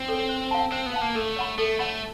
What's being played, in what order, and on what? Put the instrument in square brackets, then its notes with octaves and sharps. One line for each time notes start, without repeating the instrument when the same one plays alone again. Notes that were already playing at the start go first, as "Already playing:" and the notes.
Already playing: [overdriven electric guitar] C4
[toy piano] A4 C#5
C5
F5 A5
[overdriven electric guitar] C4 [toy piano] C5
[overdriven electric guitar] B3
[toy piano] F5 A5
[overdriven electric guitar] A#3
[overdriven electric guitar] A3 [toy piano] A4
[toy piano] C#5 F#5 B5
[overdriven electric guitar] A3 [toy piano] A4
[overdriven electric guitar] A3 [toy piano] C#5 F#5 B5